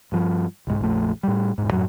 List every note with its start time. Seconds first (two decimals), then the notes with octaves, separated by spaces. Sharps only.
0.12 G2 F3
0.67 C2 G#2
0.79 A#1 F2 A3
1.23 A2 G3
1.58 E1 G#2
1.72 F#2 A2 F#3